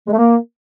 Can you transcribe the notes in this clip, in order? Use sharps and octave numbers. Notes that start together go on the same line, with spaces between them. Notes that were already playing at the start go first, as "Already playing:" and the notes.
G#3
A3
A#3